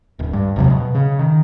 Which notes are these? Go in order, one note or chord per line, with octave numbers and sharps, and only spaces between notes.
D1
G2
G#1 E2 C3 F#3
B2
C#3
D#3